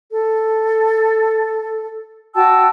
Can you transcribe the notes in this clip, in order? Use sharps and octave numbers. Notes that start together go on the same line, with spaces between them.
A4
F#4 G5 A5 E6